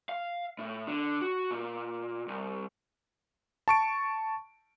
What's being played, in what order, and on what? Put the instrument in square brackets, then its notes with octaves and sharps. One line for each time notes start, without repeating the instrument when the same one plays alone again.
[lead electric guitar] F5
A2
D3
F#4
A#2
C2
[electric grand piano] A5 C#6 D7